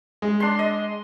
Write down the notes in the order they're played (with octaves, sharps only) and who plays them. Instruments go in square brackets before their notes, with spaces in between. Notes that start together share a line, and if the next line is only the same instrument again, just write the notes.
[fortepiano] G#3
[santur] D4 C6
D#5